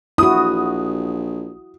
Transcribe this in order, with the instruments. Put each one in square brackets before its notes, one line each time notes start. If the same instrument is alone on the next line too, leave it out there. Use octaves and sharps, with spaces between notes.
[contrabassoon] A#1 [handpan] E4 F#4 [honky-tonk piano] D#6